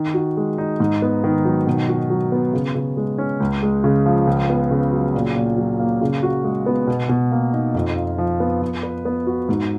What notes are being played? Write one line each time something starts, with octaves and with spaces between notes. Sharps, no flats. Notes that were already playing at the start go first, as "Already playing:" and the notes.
Already playing: D#3
F#4
G#3
D#4
G#2
B3
D#3
F#3
B2
F#4
F#3
B3
C#3
C#3
G#3
C#4
C#2
G#3
C#3
F3
C#2
B3
C#3
F#3
A#2
A#2
F#3
A#3
C#3
F#4
G#3
B3
B2
B2
A#3
D#4
F2
F4
F3
B3
F3
B4
B3
F#4
G#2